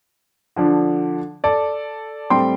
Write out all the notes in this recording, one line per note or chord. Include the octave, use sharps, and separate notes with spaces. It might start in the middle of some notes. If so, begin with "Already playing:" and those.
D3 F3 D4
A4 D5
A2 G3 C4 G5 C6